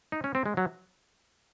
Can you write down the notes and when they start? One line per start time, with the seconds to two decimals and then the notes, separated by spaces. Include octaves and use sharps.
0.12 D#4
0.24 C#4
0.35 C4
0.46 G#3
0.57 F#3